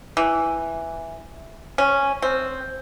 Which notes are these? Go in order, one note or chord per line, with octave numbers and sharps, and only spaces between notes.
E3
C#4
C4